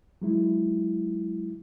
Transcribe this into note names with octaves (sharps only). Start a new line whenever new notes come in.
F#3 G#3 E4